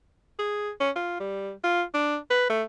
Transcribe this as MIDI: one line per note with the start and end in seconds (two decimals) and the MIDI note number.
0.39 0.70 68
0.80 0.90 61
0.96 1.15 65
1.20 1.51 55
1.64 1.82 65
1.94 2.17 62
2.30 2.48 71
2.50 2.63 57